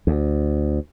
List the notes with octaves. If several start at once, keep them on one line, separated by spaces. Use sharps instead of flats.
D2